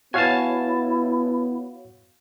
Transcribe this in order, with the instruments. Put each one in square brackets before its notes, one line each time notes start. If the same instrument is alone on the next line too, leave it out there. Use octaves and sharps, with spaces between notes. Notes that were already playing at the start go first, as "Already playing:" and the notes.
[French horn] B3 [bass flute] E4 [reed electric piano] F#4 C#5 F5 [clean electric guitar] G#5 A5